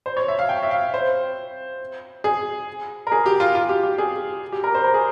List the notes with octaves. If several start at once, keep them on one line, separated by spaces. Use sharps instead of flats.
C5
C#5
E5
F5
G5
E5
F5
C5
G#4
A#4
G#4
G4
F4
F4
G4
G4
G#4
G4
A#4
C5
A#4
G#4